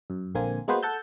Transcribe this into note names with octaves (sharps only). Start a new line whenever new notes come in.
F#2
A#1 D3 A#3 C4 G#5
G#3 A#3 B3 F#4 B4 C5
A4 F#5 A5 E6 G6